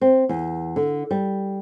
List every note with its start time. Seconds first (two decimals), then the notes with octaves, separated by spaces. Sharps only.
0.01 C4
0.29 E2
0.76 D3
1.11 G3